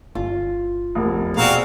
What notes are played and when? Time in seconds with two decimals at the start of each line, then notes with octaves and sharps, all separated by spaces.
0.15 G1 F4
0.95 F1 E2 A#4
1.37 B2 C4 F#4 G#4 D5 F5 A#5